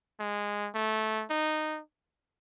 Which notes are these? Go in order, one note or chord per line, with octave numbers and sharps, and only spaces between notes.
G#3
A3
D#4